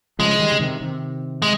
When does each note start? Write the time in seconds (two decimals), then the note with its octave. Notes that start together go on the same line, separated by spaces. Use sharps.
0.19 C#3 F3 G#3
0.39 D#3 G3
0.52 C#3
0.59 C3 D#3
0.81 C3 D#3
1.42 G#3